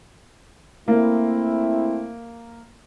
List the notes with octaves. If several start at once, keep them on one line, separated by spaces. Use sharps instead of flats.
A3 A#3 C4 E4